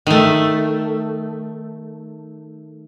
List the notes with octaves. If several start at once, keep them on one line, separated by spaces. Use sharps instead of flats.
D#3 A3